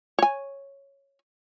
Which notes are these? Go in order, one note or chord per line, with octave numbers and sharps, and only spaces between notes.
C#5 G#5